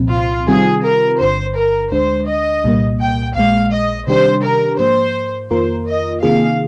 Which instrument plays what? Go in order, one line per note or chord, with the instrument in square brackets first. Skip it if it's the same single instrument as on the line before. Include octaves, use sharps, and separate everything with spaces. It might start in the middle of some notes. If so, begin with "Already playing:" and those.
Already playing: [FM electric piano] C2 A#2 F3 C4
[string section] F4
[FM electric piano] C3 D#3 G3 C4 F4 [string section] G#4
[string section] A#4
[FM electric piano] G1 G2 D3 [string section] C5
[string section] A#4
[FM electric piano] D2 D3 G#3 D4 [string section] C5
[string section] D#5
[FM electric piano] C2 A#2 G3 A#3
[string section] G5
[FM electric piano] A#1 A#2 G#3 [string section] F5
[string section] D#5
[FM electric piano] C3 D#3 G3 D4 G4 [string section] C5
[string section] A#4
[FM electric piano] G#2 F3 A#3 [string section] C5
[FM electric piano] F2 D#3 A#3 F4 A#4 [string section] C5
[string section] D#5
[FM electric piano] C3 D#3 A#3 F4 G#4 [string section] F5